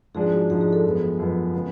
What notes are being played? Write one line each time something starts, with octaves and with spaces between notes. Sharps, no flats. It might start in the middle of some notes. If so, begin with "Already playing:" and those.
G#2 F3 G#3 D4 G#4
F#4
G#2 F3 G#3 D4 G#4
G#4
A4
F#2 F3 G#3 B3
F#2 F3 G#3 B3
C#3 G#3 B3